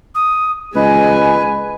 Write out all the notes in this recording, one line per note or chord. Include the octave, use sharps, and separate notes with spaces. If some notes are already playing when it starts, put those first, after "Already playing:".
D#6
C#2 G#3 B4 D#5 G#5